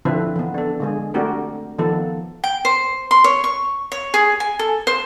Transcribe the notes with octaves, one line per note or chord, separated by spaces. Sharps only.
D3 F3 C4 E4 B4
E3 B3
D4 A4
D3 G#3 G#4
A3 C4 D4 F#4 G4 A#4
D#3 F3 B3 A4
G5
C5
C6
C#5
C#6
C#5
G#4
G#5
A4
C5